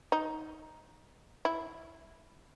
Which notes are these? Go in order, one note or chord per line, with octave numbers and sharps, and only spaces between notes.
D#4
E4